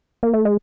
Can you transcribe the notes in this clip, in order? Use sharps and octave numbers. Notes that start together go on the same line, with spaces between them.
A#3
A3
G#3